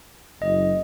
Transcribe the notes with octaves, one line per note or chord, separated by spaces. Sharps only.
F#1 D#5